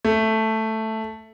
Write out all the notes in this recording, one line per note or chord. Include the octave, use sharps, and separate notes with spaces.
A3